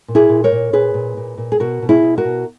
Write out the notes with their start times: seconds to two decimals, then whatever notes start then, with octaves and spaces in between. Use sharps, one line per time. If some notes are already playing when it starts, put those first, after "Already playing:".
0.08 A#2
0.15 E4 G#4
0.29 A#2
0.44 A#4 C#5
0.52 A#2
0.73 A#2 G#4 B4
0.94 A#2
1.17 A#2
1.38 A#2
1.52 G#4
1.60 B2 F#4 A#4
1.82 B2
1.89 E4 G#4
2.03 B2
2.18 F#4 A#4
2.25 B2